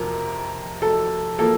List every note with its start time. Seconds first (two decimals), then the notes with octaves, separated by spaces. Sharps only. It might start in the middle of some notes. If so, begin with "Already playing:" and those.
Already playing: F2 C3 F3 A#4
0.82 A4
1.39 F3 A#3 A4